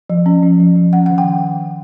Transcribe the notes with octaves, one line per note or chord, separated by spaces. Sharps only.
F3
C#4
F3
F3
F3
C#4 F#5
F#5
D#3
G5